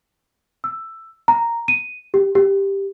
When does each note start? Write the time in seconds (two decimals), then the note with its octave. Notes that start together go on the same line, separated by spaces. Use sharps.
0.64 E6
1.28 A#5
1.68 D#7
2.14 G4
2.35 G4